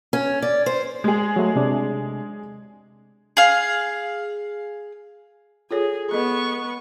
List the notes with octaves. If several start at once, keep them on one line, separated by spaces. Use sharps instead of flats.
C#4
D5
C5
G#3 G#4
F#3 A3
C3 D4
G#4 F5
F4 G#4 A4 C#5
B3 A4 D#5 C#6